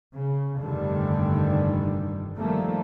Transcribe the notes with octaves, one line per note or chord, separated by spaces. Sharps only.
C#3
F1 G2 D3 D#3 G3
D#3 F3 G3 A3 A#3